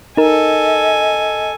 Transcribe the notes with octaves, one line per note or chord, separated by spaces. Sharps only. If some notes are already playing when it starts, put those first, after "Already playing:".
D#4 A4 A#4 D#5 G#5